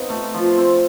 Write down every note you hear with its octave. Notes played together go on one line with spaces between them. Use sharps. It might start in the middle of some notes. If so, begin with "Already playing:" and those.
Already playing: B3 C4 D#4 D#5 F5
A3
F3
C4